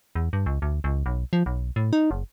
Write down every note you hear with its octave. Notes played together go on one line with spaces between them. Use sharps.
E2
G2
C#2
D2
C#2
B1
F3
B1
A2
D#4
F#1